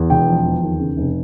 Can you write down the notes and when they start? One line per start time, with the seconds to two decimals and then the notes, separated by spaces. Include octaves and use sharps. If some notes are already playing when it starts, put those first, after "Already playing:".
Already playing: E2
0.10 E1 G5
0.28 F3
0.45 E2
0.63 D#2
0.80 C#3
0.97 F1